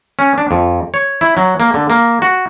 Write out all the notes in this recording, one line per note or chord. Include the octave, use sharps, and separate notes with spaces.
C#4
D4
F2
C#5
E4
F#3
A#3
D3
A#3
F#4